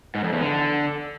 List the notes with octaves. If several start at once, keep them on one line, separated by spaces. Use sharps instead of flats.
G#2
F2
E2
D3